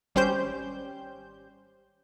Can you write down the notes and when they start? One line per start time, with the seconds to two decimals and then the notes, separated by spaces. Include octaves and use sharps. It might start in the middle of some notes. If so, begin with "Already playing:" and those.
0.15 G#1 G3 C#4 G4 C5 G6